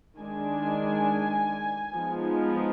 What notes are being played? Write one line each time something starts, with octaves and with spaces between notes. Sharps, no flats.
D#3 G#3 D4 G#5
F3 G#3 B3 D#4